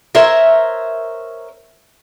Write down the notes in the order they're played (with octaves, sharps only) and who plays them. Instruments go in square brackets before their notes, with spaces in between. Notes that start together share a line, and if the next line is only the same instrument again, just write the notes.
[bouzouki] A#4 C5 C#5 E5